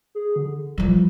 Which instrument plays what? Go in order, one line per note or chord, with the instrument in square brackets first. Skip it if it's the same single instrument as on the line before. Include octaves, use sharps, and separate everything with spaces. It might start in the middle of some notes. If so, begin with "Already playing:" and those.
[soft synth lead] G#4
D3
[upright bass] E3 F3 [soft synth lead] G3